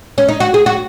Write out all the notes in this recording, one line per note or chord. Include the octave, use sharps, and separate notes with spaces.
C#4
D#4
F#4
G#4
F#4